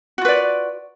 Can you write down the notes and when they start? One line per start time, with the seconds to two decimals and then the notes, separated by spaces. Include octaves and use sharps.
0.18 F#4
0.21 F4
0.25 B4
0.28 D5